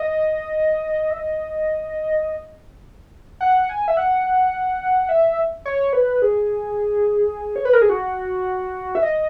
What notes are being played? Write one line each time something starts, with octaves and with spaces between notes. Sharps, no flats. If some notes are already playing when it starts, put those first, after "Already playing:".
Already playing: D#5
E5
D#5
F#5
G#5
E5
F#5
E5
C#5
B4
G#4
C#5
B4
A#4
G#4
F#4
E5
D#5